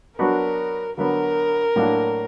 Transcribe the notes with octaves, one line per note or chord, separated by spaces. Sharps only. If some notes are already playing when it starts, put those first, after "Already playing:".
F#3 B3 D4 F#4 A#4
D3 F#3 B3 A#4
A2 F#3 A#3 D4